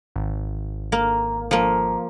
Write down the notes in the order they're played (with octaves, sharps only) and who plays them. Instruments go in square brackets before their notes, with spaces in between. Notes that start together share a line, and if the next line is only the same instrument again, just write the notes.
[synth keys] G#1
[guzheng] A#3
F3 A#3